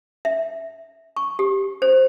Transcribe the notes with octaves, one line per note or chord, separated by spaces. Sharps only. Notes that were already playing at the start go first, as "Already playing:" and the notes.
E5
C#6
G4
C5